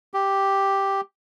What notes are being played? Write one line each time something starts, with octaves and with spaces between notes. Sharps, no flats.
G4